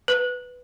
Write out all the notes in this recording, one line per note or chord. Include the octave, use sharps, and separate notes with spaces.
B4